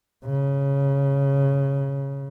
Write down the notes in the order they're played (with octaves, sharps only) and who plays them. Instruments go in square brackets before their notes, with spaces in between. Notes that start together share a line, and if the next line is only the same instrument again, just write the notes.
[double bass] C#3